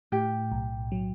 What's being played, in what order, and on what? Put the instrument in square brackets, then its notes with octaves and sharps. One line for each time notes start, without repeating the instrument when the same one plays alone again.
[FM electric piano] A2 [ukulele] G4
[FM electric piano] B1
F#3